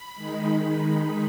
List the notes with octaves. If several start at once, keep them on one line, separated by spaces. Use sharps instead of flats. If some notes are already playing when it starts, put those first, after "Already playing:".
Already playing: B5
D#3 G#3 D#4